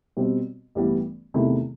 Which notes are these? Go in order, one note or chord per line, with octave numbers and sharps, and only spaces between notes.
B2 G3 C4 F#4
A1 G2 E3 G3 B3
E2 C3 D#3 A3 E4